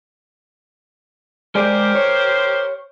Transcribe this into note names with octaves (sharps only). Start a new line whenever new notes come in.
G#3 G4 G#4 A#4 C5 D5
C#5